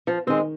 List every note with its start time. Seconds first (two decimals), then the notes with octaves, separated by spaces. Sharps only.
0.07 F3
0.27 D#3 G#3 C4